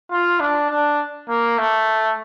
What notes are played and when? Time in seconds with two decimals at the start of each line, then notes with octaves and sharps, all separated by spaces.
0.11 F4
0.40 D4
0.70 D4
1.29 A#3
1.58 A3